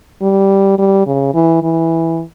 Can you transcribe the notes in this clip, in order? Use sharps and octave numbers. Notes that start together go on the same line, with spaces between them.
G3
G3
C#3
E3
E3